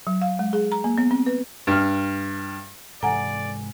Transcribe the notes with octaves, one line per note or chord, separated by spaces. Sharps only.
F#3
F5
G#3
G#4
A#5
A#3
B3
C4
B4
G2 F6
G#2 C3 E3 A4 D5 F#5 G#5 A#5